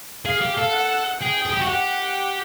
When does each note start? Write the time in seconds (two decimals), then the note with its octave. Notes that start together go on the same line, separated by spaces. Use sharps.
0.25 G#4 F5
0.41 G4
0.58 A4
0.73 F#5
1.21 G#4 G5
1.46 G#4
1.53 G4
1.61 F#4
1.69 G4 F#5